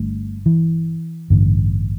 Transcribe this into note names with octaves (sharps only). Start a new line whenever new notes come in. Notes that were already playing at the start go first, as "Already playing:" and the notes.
Already playing: G1 G2 D3 A3
E3
A1 G2 D3